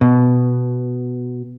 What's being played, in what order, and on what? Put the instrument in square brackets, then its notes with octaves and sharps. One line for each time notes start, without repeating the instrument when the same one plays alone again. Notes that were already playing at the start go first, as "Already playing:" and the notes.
[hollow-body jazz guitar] B2